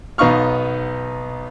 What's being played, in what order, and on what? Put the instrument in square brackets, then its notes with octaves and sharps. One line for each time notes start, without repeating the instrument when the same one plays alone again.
[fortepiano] B1 B3 D#4 F5 C#6 F6